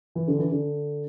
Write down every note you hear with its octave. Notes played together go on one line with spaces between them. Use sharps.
E3
D3
E3
D3